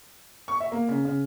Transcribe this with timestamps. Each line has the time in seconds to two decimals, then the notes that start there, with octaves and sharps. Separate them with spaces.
0.48 C#6
0.60 E5
0.72 A#3
0.89 C#3
1.05 C#3